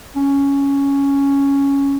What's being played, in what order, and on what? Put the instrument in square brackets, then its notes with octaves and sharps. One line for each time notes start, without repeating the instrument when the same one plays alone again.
[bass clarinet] C#4